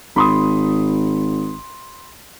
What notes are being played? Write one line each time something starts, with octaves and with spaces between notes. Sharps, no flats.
G#1 B5 C6 D#6